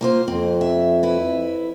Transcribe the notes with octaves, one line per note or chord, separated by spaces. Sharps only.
A#3 F4 C5
F2 C4
E5
E4 B4